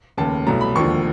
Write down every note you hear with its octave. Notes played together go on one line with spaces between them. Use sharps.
F1 D#2 C#3 A5
C2 B2 F#3 A3 A#5
B5
E1 D#2 D3 F3 C#6